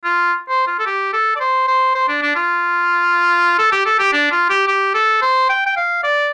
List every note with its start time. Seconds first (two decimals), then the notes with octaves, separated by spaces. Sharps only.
0.04 F4
0.49 C5
0.67 F4
0.79 A4
0.86 G4
1.13 A4
1.36 D5
1.40 C5
1.68 C5
1.95 C5
2.09 D4
2.22 D4
2.36 F4
3.59 A4
3.72 G4
3.86 A4
3.99 G4
4.13 D4
4.31 F4
4.50 G4
4.68 G4
4.94 A4
5.22 C5
5.49 G5
5.66 G5
5.77 F5
6.04 D5